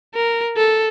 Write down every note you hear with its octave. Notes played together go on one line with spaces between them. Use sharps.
A#4
A4